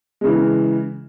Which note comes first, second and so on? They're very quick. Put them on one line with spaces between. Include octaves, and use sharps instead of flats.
G#3 C#3 E3